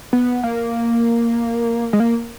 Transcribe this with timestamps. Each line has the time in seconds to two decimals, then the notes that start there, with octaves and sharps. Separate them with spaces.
0.13 B3
0.44 A#3
1.93 G#3
2.00 A#3